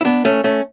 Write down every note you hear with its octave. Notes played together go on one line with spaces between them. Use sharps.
E4
B3 D4
A3 C#4
A3 C#4